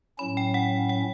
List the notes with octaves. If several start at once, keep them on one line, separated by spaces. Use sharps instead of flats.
A2 F#3 C#4 B5
G5
F#5
F#5